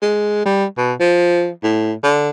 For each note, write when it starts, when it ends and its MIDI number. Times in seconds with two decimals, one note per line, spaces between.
0.02 0.45 56
0.45 0.65 55
0.77 0.93 47
1.00 1.50 53
1.63 1.93 45
2.03 2.30 50